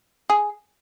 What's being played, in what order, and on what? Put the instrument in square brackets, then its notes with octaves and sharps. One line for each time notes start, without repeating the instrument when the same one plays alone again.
[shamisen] G#4